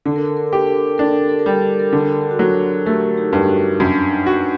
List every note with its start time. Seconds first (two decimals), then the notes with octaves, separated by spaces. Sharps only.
0.06 D3 A4
0.16 A#4
0.26 A4
0.37 A#4
0.47 A4
0.53 G4 A#4
0.67 A4
0.77 A#4
0.87 A4
0.98 D4 A#4
1.08 A4
1.18 A#4
1.29 A4
1.39 A#4
1.46 G3 A4
1.60 A#4
1.70 A4
1.79 A#4
1.91 D3 A4
2.00 A#4
2.11 A4
2.21 A#4
2.31 F#4 A4
2.39 F#3
2.86 A3 G4 A#4
3.17 D#4 G4
3.33 G2
3.48 D4 F#4
3.80 F#2 D4
4.00 D4
4.10 D#4
4.26 F#4